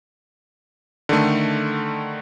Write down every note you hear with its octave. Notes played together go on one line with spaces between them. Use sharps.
D3 D#3 A3